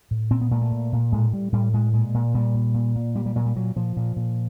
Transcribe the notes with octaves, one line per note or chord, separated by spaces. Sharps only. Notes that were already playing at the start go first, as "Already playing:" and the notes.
A2
A#2 C4
B3
A#2 A3
A3
A#2
A#2
A2 G#3
A2 G3
A2 G3
A2 G#3
A#2 G#3
A#2
A#2 G3
A#2
A#2
A#2
A#2 G3
G3
A#2 F#3
G3
A#2 F#3
A#2 F3
A#2
A#2